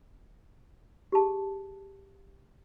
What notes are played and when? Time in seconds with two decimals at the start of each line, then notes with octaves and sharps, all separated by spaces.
1.12 G4 G#4 A5